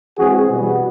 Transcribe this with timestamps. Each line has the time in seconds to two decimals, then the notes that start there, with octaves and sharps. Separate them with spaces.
0.17 E3 G#3 C4 F#4 G#4
0.48 B2 G3 B3